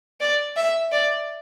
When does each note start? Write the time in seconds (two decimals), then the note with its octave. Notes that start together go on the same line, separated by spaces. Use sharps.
0.20 D5
0.56 E5
0.92 D5